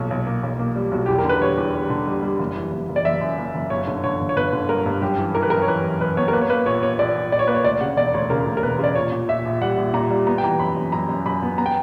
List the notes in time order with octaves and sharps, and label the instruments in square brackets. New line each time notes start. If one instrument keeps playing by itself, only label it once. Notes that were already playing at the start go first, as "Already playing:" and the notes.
Already playing: [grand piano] B1 A#2 C#5
B1
A#3
B1
A#3
G3
B1 F#4
E2 G4
A#4
D3
B4
G3 C#5
E2
G3
D3
G3
G3
F#1
E3
F#1
F#1
D5
F#1 E5
F#2
F#1
F#1
G1 C#5
D3
D3 C#5
G1
C#5
G1 B4
D3
G2 A#4
G2
F#2 G4
E3
E3 A#4
B4
F#2 A#4
C#5
E3 B4
F#2
F#2 B4
B3 C#5
A#4
A#3 B4
C#5
A#3 B4
A#1 C#5
A#3 C#5
A#1 D5
A#1
A#1 D5
C#5
A#3 B4
C#5
D2 D5
C#3 F#5
E1 D5
D2 C#5
C#3 A#4
D2
A#4
E1 B4
C#3 D5
A#2 C#5
A#2
A#2 E5
A#1
G3 F#5
A#1
A#2 A#5
G3
B3 A#5
G5
E3 A#5
F#2 B5
F#2
F#2 A#5
F#2
F#2 B5
B3
B3 A#5
G5